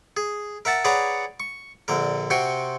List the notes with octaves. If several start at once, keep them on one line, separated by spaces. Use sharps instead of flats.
G#4
A#4 E5 F#5 A5
G#4 B4 C#5 D5 F#5 A#5
C#6
A#1 D3 A#4
C3 F#4 G5 G#5 C6 C#6